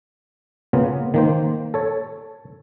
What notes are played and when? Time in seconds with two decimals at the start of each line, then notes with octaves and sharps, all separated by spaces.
0.73 C#3 A#3 B3 F4
1.14 D#3 A#3 C5
1.74 A4 C#5